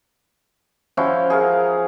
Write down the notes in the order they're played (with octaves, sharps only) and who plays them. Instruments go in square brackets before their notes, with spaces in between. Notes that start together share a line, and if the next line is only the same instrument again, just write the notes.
[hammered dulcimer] F3 C#4 E4 F#4
G#4 A#4 F5